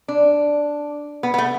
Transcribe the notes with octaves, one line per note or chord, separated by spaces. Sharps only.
D4
B3
B3
A3